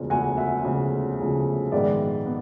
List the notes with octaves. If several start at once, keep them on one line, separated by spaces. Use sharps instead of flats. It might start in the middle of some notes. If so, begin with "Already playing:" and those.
Already playing: E1 D2 C#3 F3
E1 D2 C#3 F3 F#5 G#5
E5 F#5
E1 D2 C#3 F3
E1 D2 C#3 F3
A#1 G#2 D#3 G#3 B3 D5 E5
B3